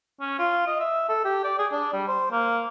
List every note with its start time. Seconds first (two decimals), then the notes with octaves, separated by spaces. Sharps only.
0.20 C#4
0.39 F4
0.67 D#5
0.80 E5
1.09 A4
1.25 G4
1.44 D5
1.58 G#4
1.72 D4
1.93 G3
2.08 C5
2.31 A#3